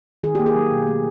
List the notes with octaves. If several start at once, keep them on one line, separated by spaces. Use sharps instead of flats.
D#3 G#4
A#3 G4
G#4
F#3
B2
A3